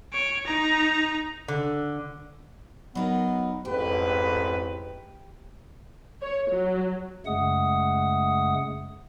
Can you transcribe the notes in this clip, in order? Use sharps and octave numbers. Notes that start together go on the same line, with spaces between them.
C#5 D7
D#4 A#5
D3
F#3 B3 D#4 A#4
A1 F2 G#2 G4 B4
C#5
F#3
F#2 C#3 G#3 A3 F#5 D#6